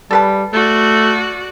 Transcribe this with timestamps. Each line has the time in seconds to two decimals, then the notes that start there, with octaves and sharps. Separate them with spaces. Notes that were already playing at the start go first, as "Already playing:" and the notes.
0.11 G3 A4 B4 A5
0.53 A3 F#4 D5